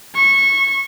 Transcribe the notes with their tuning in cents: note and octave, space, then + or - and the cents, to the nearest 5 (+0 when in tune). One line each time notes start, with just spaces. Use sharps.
C#6 -20